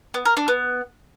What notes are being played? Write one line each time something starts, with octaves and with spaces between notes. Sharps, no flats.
B3
A#4
D4
B3